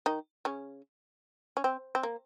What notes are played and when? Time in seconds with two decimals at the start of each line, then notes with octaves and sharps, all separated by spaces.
0.06 D#3 D#4
0.45 C#3 C#4
1.57 C#4
1.64 C4
1.95 C4
2.03 A#3